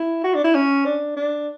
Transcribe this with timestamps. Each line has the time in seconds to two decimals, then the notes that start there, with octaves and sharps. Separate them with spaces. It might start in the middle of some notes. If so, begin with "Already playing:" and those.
Already playing: E4
0.24 F#4
0.35 D4
0.44 E4
0.55 C#4
0.85 D4
1.16 D4